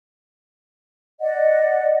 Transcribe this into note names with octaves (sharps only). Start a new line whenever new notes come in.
D5 D#5 F#5